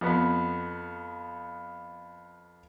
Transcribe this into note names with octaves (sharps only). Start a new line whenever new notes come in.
F2 B3